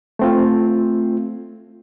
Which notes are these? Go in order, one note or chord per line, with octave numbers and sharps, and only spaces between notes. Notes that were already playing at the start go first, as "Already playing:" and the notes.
A3 C4 F4